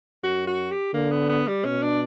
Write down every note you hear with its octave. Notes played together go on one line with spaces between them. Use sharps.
F#2 F#4
F#4
G4
D3 A#3
B3
B3
G3
B2 C#4
D4